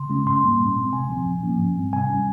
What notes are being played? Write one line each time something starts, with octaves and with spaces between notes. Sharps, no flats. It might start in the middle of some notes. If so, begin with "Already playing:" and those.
Already playing: C#3 C6
G#3 C#4
G#2 C6
G3 A#3 C#4
A#2
G#3 C4
C3 G#5
F3 C4
A#2
F3 A#3 C#4
G#2
G3 C4
C3 G#5
G3 C#4